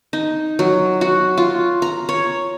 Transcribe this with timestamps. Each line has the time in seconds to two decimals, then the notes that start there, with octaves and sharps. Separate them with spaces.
0.13 D#4
0.59 F#3
1.01 F#4
1.37 F4
1.82 A#5
2.09 C#5